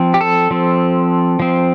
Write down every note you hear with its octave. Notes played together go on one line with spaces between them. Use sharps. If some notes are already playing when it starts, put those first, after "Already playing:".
Already playing: F3 C4
G4
A4
F3 C4
F3 C4